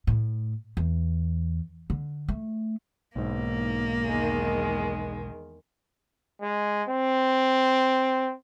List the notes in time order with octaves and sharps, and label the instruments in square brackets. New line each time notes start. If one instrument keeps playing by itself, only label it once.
[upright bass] A2
E2
D3
A3
[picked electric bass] B1 G#2 [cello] A#3
[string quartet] E2 D#3 G#3
[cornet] G#3
C4